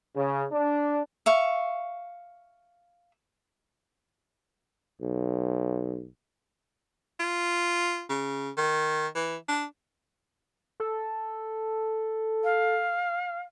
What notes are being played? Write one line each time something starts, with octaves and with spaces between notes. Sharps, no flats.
C#3
D4
E5 F5 C#6
B1
F4
C#3
D#3
E3
D4
A4
F5